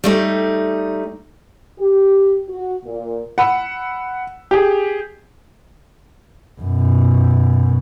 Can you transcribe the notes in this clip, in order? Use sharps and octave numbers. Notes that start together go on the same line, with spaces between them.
G3 A3 D#4
G4
F#4
A#2
F#5 B5 E6
G4 G#4
F#2 B2